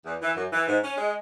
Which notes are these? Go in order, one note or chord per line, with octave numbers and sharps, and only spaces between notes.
E2
E3
F#2
E3
G#2
C#4
G#3